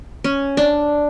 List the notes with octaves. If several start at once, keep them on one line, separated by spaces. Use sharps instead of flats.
C#4
D4